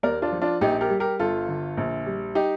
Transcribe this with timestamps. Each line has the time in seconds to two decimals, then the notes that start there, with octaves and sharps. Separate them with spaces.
0.03 D#2 A#4 D5
0.22 D4 F4
0.32 F3
0.41 D4 F4
0.61 A#1 D#4 G4
0.81 G4 A#4
0.90 G3
1.00 G4 A#4
1.19 G1 F4 A4
1.48 D3
1.77 A#1
2.06 G3
2.35 D#4 G4